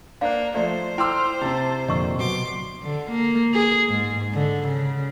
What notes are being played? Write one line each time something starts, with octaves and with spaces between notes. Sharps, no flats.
A#3 D4 C5 F5
F3 A3 C5 D5
E4 G5 C6 D6 E6 F6
C3 C4 A5
F2 A#2 D3 D#5 C#6 E6
B2 F#3 C6 D6
D3
A#3
G#4
G#2
D3
C#3